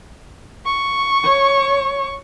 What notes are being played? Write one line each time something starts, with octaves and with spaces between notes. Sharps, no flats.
C#6
C#5